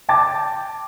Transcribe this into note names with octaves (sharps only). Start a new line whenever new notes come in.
G5 A5 D6 A6